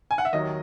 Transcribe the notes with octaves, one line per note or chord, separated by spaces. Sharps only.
G#5
F#5
E5
D#2 D#3 F#3 D#5